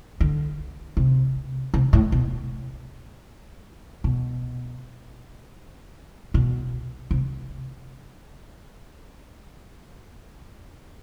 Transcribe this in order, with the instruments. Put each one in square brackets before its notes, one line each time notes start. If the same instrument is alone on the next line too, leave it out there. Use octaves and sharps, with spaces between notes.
[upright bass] D3
C3
C3
A2
B2
B2
B2
C3